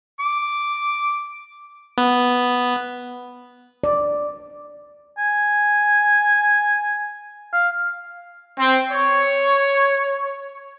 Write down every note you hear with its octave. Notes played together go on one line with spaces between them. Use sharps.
D6
B3
D5
G#5
F5
C4
C#5